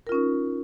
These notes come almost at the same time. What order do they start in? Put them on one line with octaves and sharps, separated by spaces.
A#4 F4 C#4 D#4